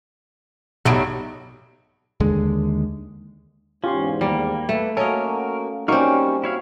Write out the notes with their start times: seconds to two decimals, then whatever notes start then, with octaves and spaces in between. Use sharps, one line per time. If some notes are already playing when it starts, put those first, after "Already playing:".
0.85 B1 A2 F#3 G3 D7
2.20 D#2 D3 G#3
3.84 E2 G#2 C#4 F4 G4 C6
4.21 D#2 G3 A#3 D6
4.69 A3 B4
4.97 A#3 C#4 F#4 A4 A#4 D#5
5.88 G3 A#3 C4 C#4 D#4 F#4 C#6 F6
6.44 E4 F#4 C#5 F5